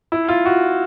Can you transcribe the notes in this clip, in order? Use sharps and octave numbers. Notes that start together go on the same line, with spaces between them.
E4
F4
F#4